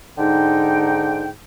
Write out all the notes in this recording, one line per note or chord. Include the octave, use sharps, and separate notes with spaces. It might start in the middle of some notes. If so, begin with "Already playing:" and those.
G#2 D3 D#4 G5